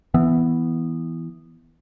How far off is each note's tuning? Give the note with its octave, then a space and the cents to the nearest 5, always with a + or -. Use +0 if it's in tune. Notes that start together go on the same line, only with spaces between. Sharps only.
E3 +0 B3 +0